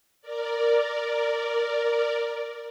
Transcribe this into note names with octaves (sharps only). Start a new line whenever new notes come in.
A#4 D5